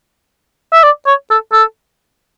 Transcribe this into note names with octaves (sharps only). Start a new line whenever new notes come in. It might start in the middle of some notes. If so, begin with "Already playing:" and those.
E5
D5
C#5
A4
A4